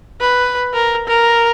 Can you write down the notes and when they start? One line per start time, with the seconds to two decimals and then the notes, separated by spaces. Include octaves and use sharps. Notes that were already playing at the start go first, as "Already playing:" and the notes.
0.20 B4
0.73 A#4
1.07 A#4